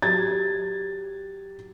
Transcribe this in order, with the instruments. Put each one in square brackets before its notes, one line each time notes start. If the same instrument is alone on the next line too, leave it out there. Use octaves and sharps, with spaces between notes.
[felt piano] F#3 G4 G#6 A6